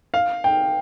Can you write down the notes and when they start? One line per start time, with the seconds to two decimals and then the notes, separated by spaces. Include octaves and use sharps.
0.14 F5
0.44 G5